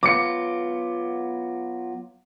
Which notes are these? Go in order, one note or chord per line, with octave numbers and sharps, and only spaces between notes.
F#3 B3 F4 D6 C#7